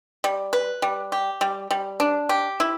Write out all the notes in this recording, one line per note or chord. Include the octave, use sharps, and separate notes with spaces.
G3
B4
G3
G4
G3
G3
D4
G4
E4